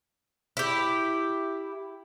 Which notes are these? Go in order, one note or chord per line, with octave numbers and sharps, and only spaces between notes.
E4 G4